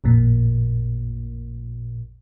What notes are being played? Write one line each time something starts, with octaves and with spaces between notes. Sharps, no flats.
A1 F2 A#2